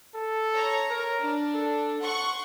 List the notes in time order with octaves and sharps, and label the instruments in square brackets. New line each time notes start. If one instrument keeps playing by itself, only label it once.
[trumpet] A4
[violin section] C#5 A#5
[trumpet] A#4
[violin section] D4
[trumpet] A4
[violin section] F#5 C6 C#6